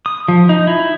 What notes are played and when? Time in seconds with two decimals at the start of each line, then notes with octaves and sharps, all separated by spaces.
0.06 D#6
0.28 F3
0.49 D#4
0.67 E4